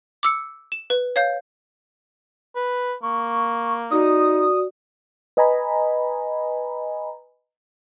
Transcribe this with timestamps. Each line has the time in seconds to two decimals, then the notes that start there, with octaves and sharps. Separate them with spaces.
0.23 D6 E6 C#7
0.72 E7
0.90 B4
1.16 C#5 F5 G6
2.56 B4
3.03 A#3 C#6
3.91 D#4 F#4 D5 D#6
5.37 B4 D#5 G#5 A#5 B5